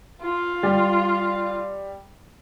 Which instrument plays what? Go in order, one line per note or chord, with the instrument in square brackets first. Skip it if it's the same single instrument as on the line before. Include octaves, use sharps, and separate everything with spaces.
[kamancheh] F4
[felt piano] G3